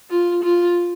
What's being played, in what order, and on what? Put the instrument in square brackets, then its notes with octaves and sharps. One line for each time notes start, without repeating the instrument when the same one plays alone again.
[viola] F4
F4